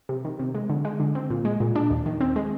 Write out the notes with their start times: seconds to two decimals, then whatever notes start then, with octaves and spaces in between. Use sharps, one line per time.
0.09 C3
0.25 D#3
0.39 C3
0.55 G#3
0.70 D3
0.85 G#3
1.00 D3
1.15 C4
1.30 A#2
1.45 G#3
1.60 A#2
1.76 D4
1.90 D#2
2.06 D#3
2.21 C4
2.36 G#3